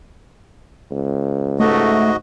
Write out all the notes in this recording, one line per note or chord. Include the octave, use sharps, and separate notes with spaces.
C#2
G#2 A3 F#4 D#5